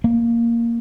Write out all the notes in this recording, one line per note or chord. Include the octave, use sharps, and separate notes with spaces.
A#3